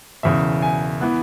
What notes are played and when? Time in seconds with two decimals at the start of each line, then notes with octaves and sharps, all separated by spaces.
0.23 E1 E2 C#3 E5
0.62 G#5
1.01 E3 B3